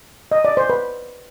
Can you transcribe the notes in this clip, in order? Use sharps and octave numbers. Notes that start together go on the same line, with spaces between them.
D#5
D5
C5
B4